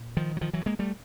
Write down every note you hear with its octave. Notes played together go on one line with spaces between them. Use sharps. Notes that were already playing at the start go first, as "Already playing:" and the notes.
Already playing: A#2
D#3 F3
F#3
D#3 F3
E3 F#3
G#3 A#3
G3 A3